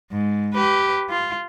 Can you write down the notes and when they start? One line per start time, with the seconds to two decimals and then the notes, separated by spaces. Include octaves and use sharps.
0.12 G#2
0.53 G4 B4
1.10 F4